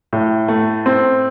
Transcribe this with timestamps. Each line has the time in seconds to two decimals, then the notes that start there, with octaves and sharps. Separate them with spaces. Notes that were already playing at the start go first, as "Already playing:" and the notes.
0.13 A2
0.48 A3
0.86 C4